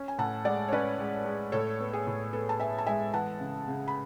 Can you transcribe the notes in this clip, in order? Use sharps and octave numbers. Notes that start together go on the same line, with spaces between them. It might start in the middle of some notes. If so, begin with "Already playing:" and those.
Already playing: C#4
G#5
A2 F#5 A5
G#3 D5 F#5
C#5
C#4 B4 D5
G#3
G#3
A2 A4 C#5
B3
G#4
A2
B3 A4
A5
B3 E5 G#5
A5
G#3 E5 G#5
E3 F#5 A5
C#3
C#3
B5